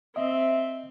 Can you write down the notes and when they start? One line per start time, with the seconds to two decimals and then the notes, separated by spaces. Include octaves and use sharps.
0.16 C4 D#5 E5